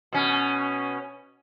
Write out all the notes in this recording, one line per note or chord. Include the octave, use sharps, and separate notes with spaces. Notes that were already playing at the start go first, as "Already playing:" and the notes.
B2 C#4